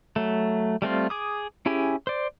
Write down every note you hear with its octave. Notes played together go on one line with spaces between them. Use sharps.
F#3 A3
G3 A3 C4 F4
G#4 D6 D#6
C#4 E4 G4 G#4 G#5
C5 D5